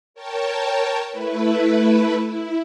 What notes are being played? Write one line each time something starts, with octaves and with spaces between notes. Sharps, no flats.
A#4 C#5 G5 A5
A3 E4 B4
E4